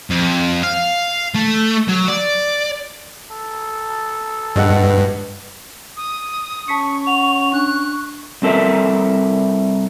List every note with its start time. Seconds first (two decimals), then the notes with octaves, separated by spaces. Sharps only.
0.10 F2
0.63 F5
1.35 A3
1.88 F#3
2.08 D5
3.32 A4
4.56 G2 B4 D#5 F#5
5.96 D#6
6.68 C#4 A5 C#6 B6 C#7
7.07 F#5 F7
7.53 D4 F#6
8.42 C2 C3 A4 A#4 E5